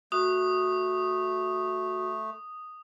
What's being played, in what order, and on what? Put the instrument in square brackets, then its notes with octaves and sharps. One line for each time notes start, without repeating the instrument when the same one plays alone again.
[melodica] A3 [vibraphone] F#4 [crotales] D#6